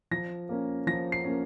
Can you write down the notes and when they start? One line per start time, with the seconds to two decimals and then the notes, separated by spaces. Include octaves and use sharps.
0.11 F3 A#6
0.49 A#3 C#4
0.87 F3 A#6
1.12 C7
1.25 A#3 C#4